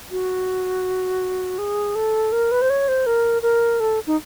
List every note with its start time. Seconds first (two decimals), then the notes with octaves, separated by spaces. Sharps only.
0.11 F#4
1.58 G#4
1.95 A4
2.32 A#4
2.51 B4
2.62 C5
2.70 C#5
2.88 C5
3.06 A#4
3.42 A#4
3.80 A4
4.07 D#4